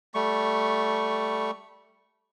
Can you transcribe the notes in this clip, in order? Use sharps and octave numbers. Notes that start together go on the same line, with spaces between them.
G3 A3 C#6